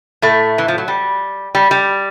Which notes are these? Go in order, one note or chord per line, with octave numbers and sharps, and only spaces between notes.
A2 A3
E3
F3
F#3
G3
G3
G3